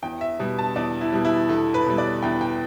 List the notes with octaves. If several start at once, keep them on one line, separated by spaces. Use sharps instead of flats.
E2 G5
E5
B2 G3
A5
E2 D5
E4
B2 G3
E4
E2 A4
B4
B2 G3
D5
E2 G5
G5